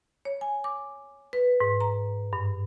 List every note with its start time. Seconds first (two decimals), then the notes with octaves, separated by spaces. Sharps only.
0.25 C#5
0.41 G#5
0.64 D6
1.33 B4
1.60 G#2
1.80 A#5
2.33 G2